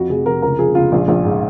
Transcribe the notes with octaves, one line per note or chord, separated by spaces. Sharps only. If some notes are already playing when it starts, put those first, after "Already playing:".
Already playing: F2 F#4
F1 G#4
F1 A#4
C#2 A#4
F3 G#4
C#2 F4
A#1
A#1
G#2